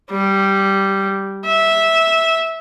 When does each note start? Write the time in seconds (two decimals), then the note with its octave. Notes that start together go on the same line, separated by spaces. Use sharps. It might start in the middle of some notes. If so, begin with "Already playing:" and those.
0.11 G3
1.46 E5